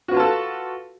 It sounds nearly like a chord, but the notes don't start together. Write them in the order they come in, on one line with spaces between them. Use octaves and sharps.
F#4 B4 F4 A5 A4